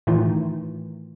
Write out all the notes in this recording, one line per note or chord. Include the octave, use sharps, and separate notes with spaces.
A2 D#3 E3 A3 D#4 F4